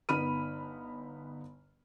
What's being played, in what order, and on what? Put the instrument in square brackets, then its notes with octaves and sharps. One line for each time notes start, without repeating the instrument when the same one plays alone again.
[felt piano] G1 B3 D#4 B5 F6 D#7